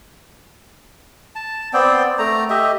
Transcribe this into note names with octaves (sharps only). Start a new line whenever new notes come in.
A5
B3 C4 D5 G5
A3 A#5
G4 D#5 E5